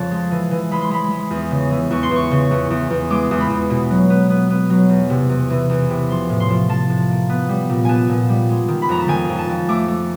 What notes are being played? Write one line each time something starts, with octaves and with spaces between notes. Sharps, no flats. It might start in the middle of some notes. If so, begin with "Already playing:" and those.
Already playing: F2 C#3 F3 A5
G#3
E3
E3
G#3 B5
C6
G#3 B5
G#3
E2
C#3
E3
E2 C#6
C6
E2 C#6
C#3
E2
E2
E2
G#3 D6
E2
B5
E2
B2
F#3
B3
B3
B3
F#3
E2
C3
E2
E3
E2
C3
F3 C6
A2
C6
F3
F3 A5
A2
A#3
B3
G3
A#2
B3 G#5 A5
A#2
G3
G#3
D#3
B5
F2 A#5
A5
D#3 G#5
F2
A5
F2
A3 D6
A3